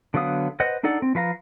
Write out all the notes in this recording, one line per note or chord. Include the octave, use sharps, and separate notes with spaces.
D3 F#3 B3 F5 D#6
B4 C5 D#5 F#5
D4 D#4 A4 D5 F#5
C4
F3 B4 F5 A#5